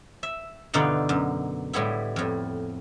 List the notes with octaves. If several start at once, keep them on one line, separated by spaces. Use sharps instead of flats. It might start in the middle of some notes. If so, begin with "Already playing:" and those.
E5
G2 B2 D3 E3 D#4 F4
F#2
A2 G3 G#3 B3 E4
F2 A2